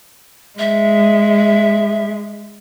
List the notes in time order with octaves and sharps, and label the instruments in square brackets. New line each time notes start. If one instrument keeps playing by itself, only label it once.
[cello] G#3 [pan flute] E5